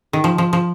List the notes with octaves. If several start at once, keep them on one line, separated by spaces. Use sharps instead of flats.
D#3
F3
F3
F3